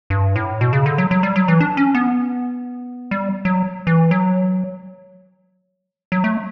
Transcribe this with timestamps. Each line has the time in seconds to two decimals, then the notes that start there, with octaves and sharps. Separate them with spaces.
0.10 G2
0.36 A2
0.61 B2
0.73 C#3
0.86 D3
0.98 F#3
1.11 F#3
1.23 G3
1.36 F#3
1.48 E3
1.61 D4
1.77 C#4
1.95 B3
3.11 G3
3.45 F#3
3.87 E3
4.11 F#3
6.12 F#3
6.24 A3